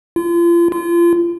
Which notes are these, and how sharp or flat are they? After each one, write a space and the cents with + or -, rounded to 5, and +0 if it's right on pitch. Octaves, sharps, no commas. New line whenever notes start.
F4 -35
F4 -30